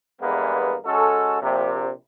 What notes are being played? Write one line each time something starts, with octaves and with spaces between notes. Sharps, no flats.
E2 G2 E3 G#3 A#3 B3
G#3 C#4 F#4 A4
A#1 C3